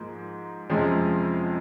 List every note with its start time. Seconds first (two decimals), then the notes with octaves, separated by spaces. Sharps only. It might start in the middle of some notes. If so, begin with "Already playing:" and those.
Already playing: G#2 F3 A#3
0.70 F2 C3 F3 G#3 C#4